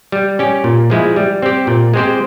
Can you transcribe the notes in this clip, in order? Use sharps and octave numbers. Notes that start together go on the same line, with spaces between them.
G3
C#4 G4
A#2
F3 G#3 E4
G3
C4 G4
A#2
G#3 C4 G4 C5